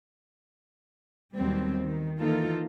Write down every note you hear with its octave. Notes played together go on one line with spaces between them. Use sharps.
D#2 B2 F#3 G3 C4
D#3
D#3 E3 A#3 D#4 F4 A4